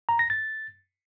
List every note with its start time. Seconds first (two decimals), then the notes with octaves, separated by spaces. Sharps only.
0.09 A#5
0.19 A#6
0.30 A6